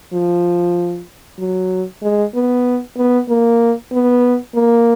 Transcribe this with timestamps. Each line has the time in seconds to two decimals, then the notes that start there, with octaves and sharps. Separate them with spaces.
0.13 F3
1.39 F#3
2.02 G#3
2.35 B3
2.97 B3
3.29 A#3
3.92 B3
4.55 A#3